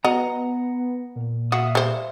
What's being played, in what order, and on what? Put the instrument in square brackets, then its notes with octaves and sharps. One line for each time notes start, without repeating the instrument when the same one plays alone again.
[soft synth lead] B3 [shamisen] F#4 D#5 [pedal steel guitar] F#5 A#5
[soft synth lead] A#2
[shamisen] F#4 [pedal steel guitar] E5 F5 D#6
[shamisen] G3 C5